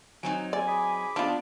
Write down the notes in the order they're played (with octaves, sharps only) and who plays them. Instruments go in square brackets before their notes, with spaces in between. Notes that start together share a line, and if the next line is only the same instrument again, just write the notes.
[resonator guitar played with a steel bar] F#3 C4 D#4 [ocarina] G#5
[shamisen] D5 [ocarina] G#5
[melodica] G#4 B5 D6
[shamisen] F3 B3 [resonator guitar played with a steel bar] D4 F4